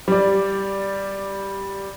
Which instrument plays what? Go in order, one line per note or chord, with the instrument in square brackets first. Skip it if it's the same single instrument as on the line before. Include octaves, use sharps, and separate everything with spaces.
[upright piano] G3 D5